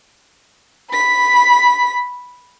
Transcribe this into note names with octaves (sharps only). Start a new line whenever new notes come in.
B5 B6